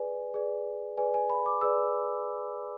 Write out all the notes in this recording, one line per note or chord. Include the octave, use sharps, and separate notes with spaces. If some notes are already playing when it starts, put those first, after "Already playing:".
Already playing: G#4 B4 D5 G#5
G#4 B4 D5
G#4 B4 D5 G#5
G#5
B5
D6
G#4 B4 D5 E6